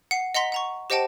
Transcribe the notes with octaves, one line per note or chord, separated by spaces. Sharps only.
F#5 C7
D#5 F#5 A#5 C6 B6
F#5 A#5 C#6
G4 C5 D#5 F#5 G5 A5